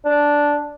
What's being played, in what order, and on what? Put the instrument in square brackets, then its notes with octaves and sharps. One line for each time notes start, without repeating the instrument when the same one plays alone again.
[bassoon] D4